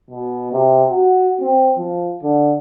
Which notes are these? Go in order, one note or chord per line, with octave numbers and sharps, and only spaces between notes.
B2
C3
F#4
C4
F3
D3